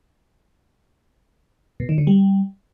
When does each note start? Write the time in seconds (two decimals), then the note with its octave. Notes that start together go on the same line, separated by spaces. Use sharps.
1.80 B2
1.89 D#3
1.98 D3
2.07 G3